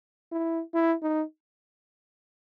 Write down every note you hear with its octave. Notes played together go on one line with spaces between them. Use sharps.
E4
E4
D#4